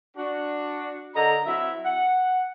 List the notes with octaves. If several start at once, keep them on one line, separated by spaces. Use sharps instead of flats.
D4 F#4
D3 A#4 D#5 A#5
F#3 C4 E4 E5
F#5